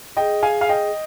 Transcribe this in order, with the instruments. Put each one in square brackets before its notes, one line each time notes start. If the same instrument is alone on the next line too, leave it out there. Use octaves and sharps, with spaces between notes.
[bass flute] G#4 [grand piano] D#5 G5
[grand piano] F5 G#5
F5
D#5 G5